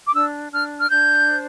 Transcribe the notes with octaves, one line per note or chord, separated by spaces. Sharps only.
D6
D4 E6
D4 F6
F6
D4 G6
C5